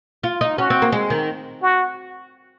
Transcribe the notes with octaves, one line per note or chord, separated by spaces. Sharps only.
F4
D#4
C#4 F#4
C4
A#3
G#3
D#3
F#4